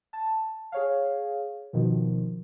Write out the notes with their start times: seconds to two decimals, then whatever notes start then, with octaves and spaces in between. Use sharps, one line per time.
0.13 A5
0.72 G#4 C#5 F5
1.73 B2 D#3 F3